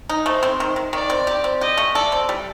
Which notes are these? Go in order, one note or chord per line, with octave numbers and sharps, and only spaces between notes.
D#4
A3 C5
C4
D#3
D#3
D#3 D5
C4
G4
C4
G4 D#5
A3
A4 D5
C4
G3